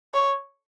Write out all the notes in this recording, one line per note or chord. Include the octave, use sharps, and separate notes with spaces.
C#5